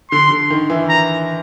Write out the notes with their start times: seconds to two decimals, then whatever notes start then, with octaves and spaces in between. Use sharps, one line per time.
0.11 D3 C6
0.31 D3
0.50 D#3
0.70 E3
0.89 A#5